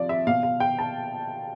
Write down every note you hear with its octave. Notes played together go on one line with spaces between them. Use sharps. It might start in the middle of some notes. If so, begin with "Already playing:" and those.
Already playing: C3 F3 D5
E5
B2 F5
F5
G5
A5